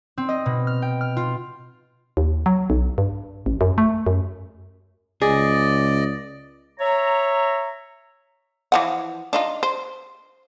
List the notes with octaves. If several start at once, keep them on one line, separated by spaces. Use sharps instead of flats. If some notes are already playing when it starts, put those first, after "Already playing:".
C4
D#5
B2
F6
G5
F6
F4
D#2
F#3
B1
G2
A1
F#2
A3
F#2
C#2 G#4 D5 D#5
C#5 E5 A#5
E3 F3 F#5
D4 D#4 F4
C5